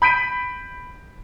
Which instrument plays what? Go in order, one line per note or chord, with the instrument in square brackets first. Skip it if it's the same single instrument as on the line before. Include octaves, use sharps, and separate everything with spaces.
[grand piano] B5 G6 B6 D7 D#7